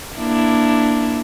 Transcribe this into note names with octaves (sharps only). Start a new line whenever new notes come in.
A#3 D4 E4